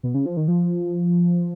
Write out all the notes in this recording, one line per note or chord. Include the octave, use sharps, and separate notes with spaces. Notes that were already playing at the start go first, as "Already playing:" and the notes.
B2
C#3
F3
D#3
F3